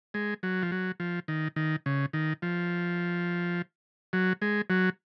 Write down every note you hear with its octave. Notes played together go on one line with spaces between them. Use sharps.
G#3
F#3
F3
F#3
F3
D#3
D#3
C#3
D#3
F3
F#3
G#3
F#3